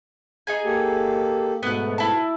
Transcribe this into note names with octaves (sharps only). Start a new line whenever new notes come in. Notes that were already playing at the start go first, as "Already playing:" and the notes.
D#4 G#4 G#5
A#3 G4 A4
G#2 B2 A3 B3 F#6
E4 A5